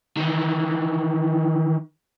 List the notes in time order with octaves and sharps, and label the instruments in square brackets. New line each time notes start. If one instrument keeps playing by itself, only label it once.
[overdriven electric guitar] D#3 E3